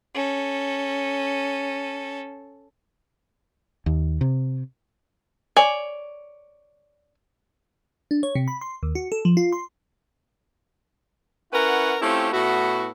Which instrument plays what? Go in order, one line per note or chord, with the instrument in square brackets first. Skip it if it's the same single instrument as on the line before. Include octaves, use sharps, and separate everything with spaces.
[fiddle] C#4 A4
[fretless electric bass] D#2
C3
[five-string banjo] C#5 D5 G#5
[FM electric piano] D4
C#5
C3
B5
C6
D#2
F#4
A4
F3
F4
C6
[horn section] C#4 E4 A#4 B4 F#5
A3 C4 C#4 E4 F4 G4
A2 B3 E4 F#4